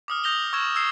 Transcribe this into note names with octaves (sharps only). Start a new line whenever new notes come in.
D6 D#6 F6
D#6 G6 A#6 F7 G7
C#6 E6 G#6 E7
E6 G#6 C7